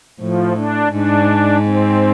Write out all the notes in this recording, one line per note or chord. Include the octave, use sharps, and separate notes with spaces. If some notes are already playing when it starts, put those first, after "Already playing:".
A2 F3
D4
G#2 D4
C4